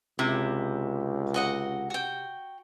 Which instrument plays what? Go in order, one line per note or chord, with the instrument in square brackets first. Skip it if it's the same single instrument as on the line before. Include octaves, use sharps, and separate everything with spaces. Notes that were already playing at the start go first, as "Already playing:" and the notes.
[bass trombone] C#2 [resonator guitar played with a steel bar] C3 [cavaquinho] E4
[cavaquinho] F#4 D#5 F#5
F#4 G5